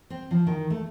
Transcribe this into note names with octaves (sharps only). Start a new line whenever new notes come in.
C4
F3
D#3
A3